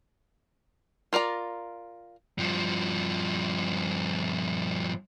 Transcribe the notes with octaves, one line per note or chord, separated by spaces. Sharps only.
F4 A#4 D5 A#5
G2 F3